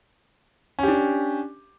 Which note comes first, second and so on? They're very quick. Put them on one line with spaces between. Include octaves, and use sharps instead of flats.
C#4 G4 D4